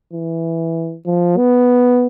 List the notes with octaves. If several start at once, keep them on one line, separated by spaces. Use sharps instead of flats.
E3
F3
B3